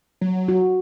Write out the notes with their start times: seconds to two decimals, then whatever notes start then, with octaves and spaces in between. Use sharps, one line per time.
0.21 F#3
0.48 F#4